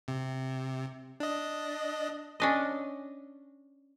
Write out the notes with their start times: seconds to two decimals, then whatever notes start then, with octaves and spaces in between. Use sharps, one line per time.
0.08 C3
1.20 D4 D#5
2.40 C#4 D4 D#5